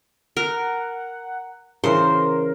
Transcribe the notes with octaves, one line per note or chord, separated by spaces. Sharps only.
A#4 F#5
C#3 E3 A#4 C5